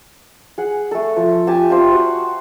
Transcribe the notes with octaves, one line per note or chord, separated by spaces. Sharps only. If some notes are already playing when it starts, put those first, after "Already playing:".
G#4 F#5
A3 A4
F3
G4 G#5 A5
F4 G4 C5 E5
F#4 F#5